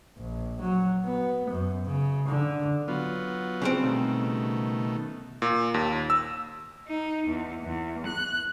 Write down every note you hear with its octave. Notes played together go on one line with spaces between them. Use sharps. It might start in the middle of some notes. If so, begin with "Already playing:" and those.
A#1
F#3
B3
F#2
C#3
D3
F#3 B3 F4
C#3 G3 C4
B2 D#3 A3
A#2
D#2
E6
D#4
E2
E2
F#6